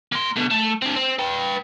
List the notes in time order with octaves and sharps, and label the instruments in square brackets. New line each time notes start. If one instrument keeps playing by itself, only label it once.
[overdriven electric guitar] A#3 C6
B2 D3
A3
C4 D4
C4
B4 G5